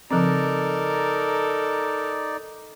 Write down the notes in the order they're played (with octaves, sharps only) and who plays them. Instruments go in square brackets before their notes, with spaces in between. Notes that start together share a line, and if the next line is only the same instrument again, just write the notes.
[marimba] C#3 F3 C4 [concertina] D#4 D5 [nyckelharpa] A4 A#4